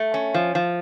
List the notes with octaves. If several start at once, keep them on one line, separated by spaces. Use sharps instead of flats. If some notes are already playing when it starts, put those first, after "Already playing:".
Already playing: A3
C#4
F3
F3